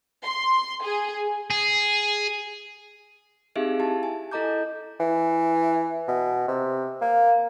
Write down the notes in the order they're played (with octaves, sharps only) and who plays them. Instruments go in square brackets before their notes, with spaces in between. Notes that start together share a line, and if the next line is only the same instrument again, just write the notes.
[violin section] C6
G#4
[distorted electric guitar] G#4
[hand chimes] C4 D#4 G4 G#4 E5 F5
E4 G4 A5
G#5
E4 A4 D#5 A#5 D6 G6
[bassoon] E3
B2
C3
A#3